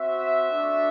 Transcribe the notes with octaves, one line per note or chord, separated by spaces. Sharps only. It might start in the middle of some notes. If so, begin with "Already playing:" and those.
Already playing: C4 F#4 E5
A3 D4 F#4